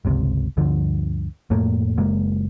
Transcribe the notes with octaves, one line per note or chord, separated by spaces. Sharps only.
G1 C#2 C3
D2 G2 D3 F3
F2 A2 A3 A#3
F#1 G#3 A#3